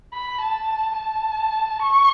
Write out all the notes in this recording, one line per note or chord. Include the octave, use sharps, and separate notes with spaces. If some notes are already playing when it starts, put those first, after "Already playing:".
B5
A5
A5
C#6